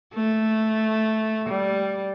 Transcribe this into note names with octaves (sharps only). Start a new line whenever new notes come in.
A3
G3